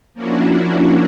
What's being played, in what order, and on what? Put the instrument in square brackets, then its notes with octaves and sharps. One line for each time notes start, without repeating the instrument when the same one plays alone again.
[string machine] F3 A#3 C#4 D4 E4 F#4